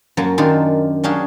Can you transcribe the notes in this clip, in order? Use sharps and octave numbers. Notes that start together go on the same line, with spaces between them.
F#2 F#3 A#3 A5
F#2 D#3 D4 F4 D5
F#3 C#4 D4 G4 G#4 F5